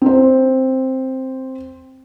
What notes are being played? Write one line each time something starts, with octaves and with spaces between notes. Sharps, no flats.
C4 C5